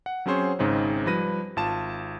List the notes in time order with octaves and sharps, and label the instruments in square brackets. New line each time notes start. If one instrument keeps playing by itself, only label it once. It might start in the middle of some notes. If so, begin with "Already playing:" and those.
[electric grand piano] F#5
F#3 C4 C#4 G#4 C5 C#5
G#1 G#2 C#3 C4 D#4
F3 G3 B4 A#6 D#7
G#1 F4 A5 E7